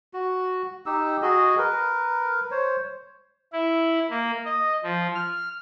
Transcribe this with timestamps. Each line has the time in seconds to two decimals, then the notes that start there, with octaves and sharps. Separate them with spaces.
0.13 F#4
0.86 D#4 G4 E6
1.22 F#4 G#4 D#5
1.58 A#4 B4
2.51 C5 C#5
3.52 E4
4.09 A#3
4.45 D#5
4.83 F3
5.15 F6